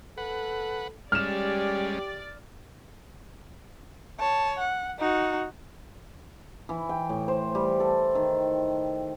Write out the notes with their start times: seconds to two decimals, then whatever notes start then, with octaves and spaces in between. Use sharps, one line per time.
0.18 A4 B4 F#5
1.12 G3 G#3 C#4 G4 D5 F6 E7
4.19 C#5 A5
4.59 F#5
4.99 D#4 F#4
6.69 E3
6.89 G5
7.09 A2
7.28 C5
7.55 G3
7.80 A4
8.15 D#3